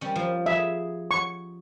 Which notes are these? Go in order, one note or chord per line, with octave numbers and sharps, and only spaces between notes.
G3 C#4
F3
G#4 E5
C#6